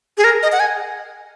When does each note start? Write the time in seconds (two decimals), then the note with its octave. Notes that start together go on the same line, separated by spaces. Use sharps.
0.18 G#4
0.24 A#4
0.43 D#5
0.52 F#5
0.60 G#5